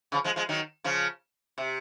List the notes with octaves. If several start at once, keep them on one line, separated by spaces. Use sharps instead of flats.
C#3 F3
F3 G#3
F3 G#3
D#3 F#3
C#3 F3
C3